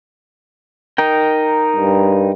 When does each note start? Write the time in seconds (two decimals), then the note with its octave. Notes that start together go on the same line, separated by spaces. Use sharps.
0.98 D#4 A#4 G5
1.76 G2